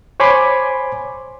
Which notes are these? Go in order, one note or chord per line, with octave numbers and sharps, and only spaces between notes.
C5 C#5 G#5 B5 C6 D6